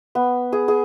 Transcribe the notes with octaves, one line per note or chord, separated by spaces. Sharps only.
B3
G#4
G#4